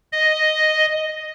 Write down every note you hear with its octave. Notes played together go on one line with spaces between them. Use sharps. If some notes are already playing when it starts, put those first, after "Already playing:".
D#5